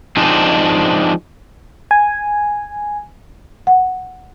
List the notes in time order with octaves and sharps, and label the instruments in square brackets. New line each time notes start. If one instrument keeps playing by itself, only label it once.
[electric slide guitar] F3 G#3 C4 D4 D#4
[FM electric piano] G#5
[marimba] F#5